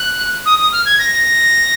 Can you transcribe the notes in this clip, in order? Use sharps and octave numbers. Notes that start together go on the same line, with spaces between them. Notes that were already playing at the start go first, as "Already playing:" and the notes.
Already playing: F#6
D#6
D#6
F6
G#6
A#6